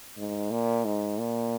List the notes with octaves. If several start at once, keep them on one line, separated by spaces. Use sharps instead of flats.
G#2
A#2
G#2
A#2